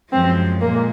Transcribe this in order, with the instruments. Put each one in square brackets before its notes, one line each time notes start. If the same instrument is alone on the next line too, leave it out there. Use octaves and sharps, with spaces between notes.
[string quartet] F#2 F3 G#3 [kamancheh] C4
[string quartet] A#2 G#3 [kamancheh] A#3